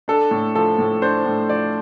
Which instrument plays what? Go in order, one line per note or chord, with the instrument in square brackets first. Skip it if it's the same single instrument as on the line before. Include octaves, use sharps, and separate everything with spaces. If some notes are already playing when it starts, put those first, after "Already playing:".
[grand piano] D4 A4
A2
F3 A4
A2
D4 C5
A2
F3 D5